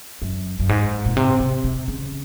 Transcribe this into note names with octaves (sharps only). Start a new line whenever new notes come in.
F#2
F#2
G#2
A#2
C3
C3
C3
C#3